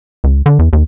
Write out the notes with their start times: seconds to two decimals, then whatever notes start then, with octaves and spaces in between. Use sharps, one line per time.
0.24 C#2
0.46 D3
0.59 E2
0.73 D#2